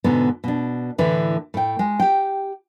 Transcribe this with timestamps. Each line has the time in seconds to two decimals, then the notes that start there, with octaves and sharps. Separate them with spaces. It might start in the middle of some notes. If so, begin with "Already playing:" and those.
0.04 G#2 B2 D3 B3
0.44 B2 D4
0.98 A2 D3 E3 B4
1.54 A2 G5
1.79 G#3
1.99 G4 G5